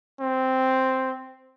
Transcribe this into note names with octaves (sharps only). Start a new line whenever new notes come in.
C4